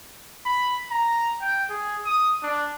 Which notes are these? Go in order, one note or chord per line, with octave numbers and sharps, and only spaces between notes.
B5
A#5
G5
G#4
D#6
D4